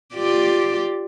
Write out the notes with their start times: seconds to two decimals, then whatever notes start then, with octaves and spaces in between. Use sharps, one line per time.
0.15 F4 G4 D5